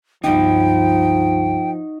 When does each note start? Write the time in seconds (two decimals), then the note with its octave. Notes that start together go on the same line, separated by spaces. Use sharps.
0.24 C#2 G2 F3 D#4 F#4 G5